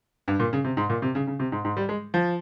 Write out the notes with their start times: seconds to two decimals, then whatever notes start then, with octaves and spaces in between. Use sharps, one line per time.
0.28 G2
0.40 A#2
0.53 C#3
0.64 C3
0.77 G#2
0.90 A#2
1.02 C3
1.15 C#3
1.27 C#3
1.40 C3
1.52 G#2
1.65 G#2
1.77 G3
1.89 G#3
2.14 F3